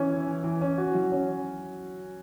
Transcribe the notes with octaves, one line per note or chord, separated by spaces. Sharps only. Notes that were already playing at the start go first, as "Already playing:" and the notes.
Already playing: E3 C#4
E4
E3
E3
C#4
F#4
F#3
C#4